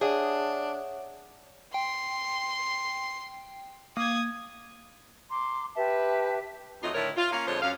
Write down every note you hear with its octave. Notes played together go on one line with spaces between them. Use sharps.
D4 G#4 C#5 E5 F#5
G5 C6
A#3 D#6 G#6
A#5 C6 D6
G4 B4 E5 A5
F2 F#3 A3 D#4 F4 D#5
A2 D3 D#3 E4 A#4 C#5
F4
A#3 C#4 F4 F5
F2 D3 G#3 A3 C5 C#5
F#2 C#4 F5